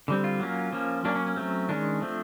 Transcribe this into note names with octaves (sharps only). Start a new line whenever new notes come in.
D3 G3 C4
F4
F#3 A#3 C#4
F3 A#3 C#4
F#3 A#3 C#4 D4
C#4
C#4
F#3 A3 C4
D#3 G#3 C#4 D4
F3 A3 C4